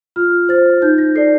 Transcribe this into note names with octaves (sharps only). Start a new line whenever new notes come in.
F4 F6
C5 A6
D#4 G6
A#6
A4 D5 C7